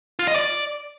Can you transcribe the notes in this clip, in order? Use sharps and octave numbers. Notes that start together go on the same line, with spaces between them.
F4
D#5
D5